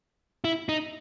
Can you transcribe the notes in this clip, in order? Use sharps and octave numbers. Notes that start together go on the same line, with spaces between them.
E4
D#4